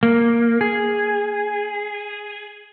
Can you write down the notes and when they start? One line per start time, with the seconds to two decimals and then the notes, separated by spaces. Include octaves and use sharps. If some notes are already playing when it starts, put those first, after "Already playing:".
0.03 A#3
0.61 G#4